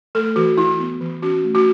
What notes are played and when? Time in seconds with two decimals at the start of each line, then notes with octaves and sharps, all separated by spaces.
0.15 A3 A4
0.36 E3 F#4
0.57 E3 E4
0.80 B3
1.00 E3
1.22 C#4 F#4
1.44 A3
1.55 F#4